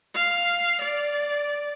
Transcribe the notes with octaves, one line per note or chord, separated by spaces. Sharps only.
F5
D5